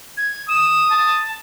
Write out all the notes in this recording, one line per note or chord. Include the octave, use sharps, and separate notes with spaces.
G#6
D#6 E7
A5